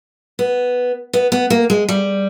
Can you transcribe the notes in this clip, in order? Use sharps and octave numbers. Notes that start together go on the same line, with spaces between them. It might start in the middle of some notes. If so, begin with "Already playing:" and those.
B3
B3
B3
A#3
G#3
G3